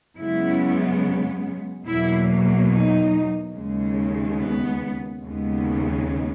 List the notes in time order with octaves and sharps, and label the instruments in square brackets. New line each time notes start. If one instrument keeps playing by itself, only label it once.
[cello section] F#2 C#3 G#3 B3 E4
E2 B2 F#3 A#3 E4
D#4
D#2 C#3 G#3
B3
D#2 C#3 G#3 B3